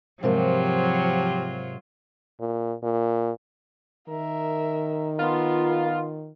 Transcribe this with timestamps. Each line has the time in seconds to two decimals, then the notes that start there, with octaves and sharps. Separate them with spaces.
0.23 G#2 C3 F3 F#3 F4 G4 A#4
2.40 A#2
2.83 A#2
4.09 D#3 A#4 E5
5.19 B3 F4 A#4